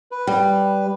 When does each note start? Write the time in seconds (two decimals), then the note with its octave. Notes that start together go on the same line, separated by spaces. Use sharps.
0.11 B4
0.27 G3